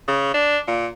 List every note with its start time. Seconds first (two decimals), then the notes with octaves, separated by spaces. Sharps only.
0.08 C#3
0.34 D4
0.68 A#2